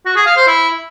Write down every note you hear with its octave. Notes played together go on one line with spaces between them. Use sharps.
F#4
G#4
F5
C5
E4